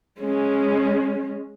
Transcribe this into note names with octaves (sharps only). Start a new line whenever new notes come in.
G#3 C#4